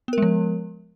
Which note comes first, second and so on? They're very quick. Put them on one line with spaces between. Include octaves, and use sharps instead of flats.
B3 A#4 G#3 F3